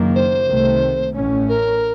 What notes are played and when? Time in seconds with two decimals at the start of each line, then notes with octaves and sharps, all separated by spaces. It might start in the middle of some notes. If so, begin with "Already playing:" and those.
Already playing: F#1 F#2 D#3 A#3
0.15 C5
0.48 C2 C3 D#3 A3
1.15 A1 A2 A3 C#4
1.49 A#4